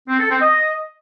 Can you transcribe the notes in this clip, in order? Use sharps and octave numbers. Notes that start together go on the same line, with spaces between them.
C4
A4
C4
D#5